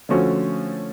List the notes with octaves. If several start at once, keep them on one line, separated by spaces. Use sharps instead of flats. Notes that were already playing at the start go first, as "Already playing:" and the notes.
D3 F3 A3 C#4 F#4